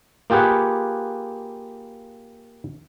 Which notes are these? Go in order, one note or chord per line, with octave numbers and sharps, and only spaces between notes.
A#3 F4 G4 G#4 B4 F#5